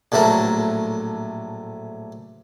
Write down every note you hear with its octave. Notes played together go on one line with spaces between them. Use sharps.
A#1 A2 F#3 A3 A#4